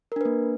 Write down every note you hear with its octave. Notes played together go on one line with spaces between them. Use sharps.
A#3 D4 A#4 B4